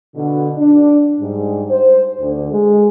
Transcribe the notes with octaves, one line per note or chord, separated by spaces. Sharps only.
B2 D3
D4
G#2 G3
C5
D2 D3
G#3